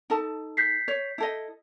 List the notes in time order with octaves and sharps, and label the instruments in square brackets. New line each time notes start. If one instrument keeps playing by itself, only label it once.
[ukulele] D#4 A4 A5
[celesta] G6 B6 C7
[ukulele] C#5
E4 A4 D#5